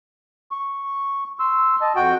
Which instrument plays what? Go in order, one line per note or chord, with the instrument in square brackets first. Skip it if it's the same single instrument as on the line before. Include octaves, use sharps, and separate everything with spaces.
[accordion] C#6
C6 E6
D#5 A5
[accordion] F2 [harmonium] F#4 G5